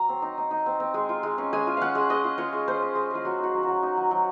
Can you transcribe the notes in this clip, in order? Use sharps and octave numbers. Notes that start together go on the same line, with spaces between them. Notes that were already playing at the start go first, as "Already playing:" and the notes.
Already playing: F#3 A#5
C4
D#4
D#4
D#4
C4
C4
G#3
F4
G#3
C#4
G#3 G#5
F4
C#4 F5 F#5
G#3
G#3 D#5
F4
F4 C#5
G#3
C#4 C5
C#4
G#3
G#3 F4
F#3 F#4
D#4 F#4
F#3
F#4
F#3
D#4
F#3
F#3